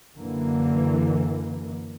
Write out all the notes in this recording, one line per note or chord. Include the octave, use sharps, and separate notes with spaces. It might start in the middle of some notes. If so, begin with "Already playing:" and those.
F#2 D3 E3 A#3